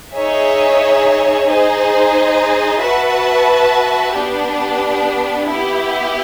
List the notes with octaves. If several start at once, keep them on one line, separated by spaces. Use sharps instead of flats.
D#4 G#4 C#5 E5
D#4 G#4 C5
F#4 B4 E5 A5
B3 D4 G4
B3 E4 G4